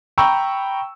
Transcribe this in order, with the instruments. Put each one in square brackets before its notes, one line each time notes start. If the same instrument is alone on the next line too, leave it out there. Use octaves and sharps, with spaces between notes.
[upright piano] G5 A#5 B5 C#6 E6